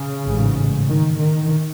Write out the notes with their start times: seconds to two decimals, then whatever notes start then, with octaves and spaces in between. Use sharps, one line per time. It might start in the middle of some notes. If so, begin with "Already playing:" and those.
Already playing: C#3
0.26 A1 G#2
0.87 D#3
1.18 D#3